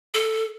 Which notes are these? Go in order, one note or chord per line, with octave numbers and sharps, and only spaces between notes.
A4